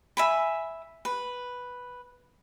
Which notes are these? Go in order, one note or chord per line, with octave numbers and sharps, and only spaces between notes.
E5 G#5 B5
B4